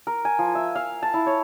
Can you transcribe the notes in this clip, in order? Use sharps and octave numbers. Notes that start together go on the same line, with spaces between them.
A#4
G#5
F3
E5
F5
A5
E4
C#5